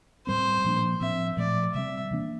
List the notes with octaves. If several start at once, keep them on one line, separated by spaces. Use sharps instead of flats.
A2 G3 C4 C5
A#2 F3 A#3 D4
A2 F3 C4 E5
A#2 F3 A3 D5
C3 G3 C4 E5
C3 E3 A#3 D4